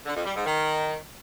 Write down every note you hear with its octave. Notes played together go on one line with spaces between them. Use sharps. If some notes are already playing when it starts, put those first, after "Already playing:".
D3
F2
G3
G#2
D#3